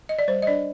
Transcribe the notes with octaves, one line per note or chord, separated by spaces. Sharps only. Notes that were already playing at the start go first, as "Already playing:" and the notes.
D#5
D5
G3 C5
D#5
D4 D5